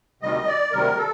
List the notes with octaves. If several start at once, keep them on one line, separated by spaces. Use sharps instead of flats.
D2 C3 D#3 G3 D#5
D5
D2 C3 D#3 G3 A#4
A4